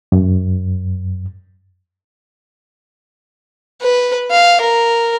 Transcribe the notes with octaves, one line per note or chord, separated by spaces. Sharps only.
F#2
B4
F5
A#4